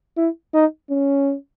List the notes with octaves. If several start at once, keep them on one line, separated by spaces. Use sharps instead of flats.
E4
D#4
C#4